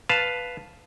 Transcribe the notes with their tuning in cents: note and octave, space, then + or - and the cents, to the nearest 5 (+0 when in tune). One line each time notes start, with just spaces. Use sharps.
B4 +0 F5 +0 A5 +0